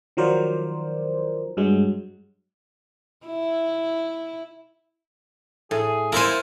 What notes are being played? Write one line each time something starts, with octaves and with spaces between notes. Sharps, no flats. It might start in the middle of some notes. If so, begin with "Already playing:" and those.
D#3 F3 F#3 A#4 C5 D5
G2 F#3 G#3
E4
A2 G#4
E4 F4 A4 A#4 C5 G#5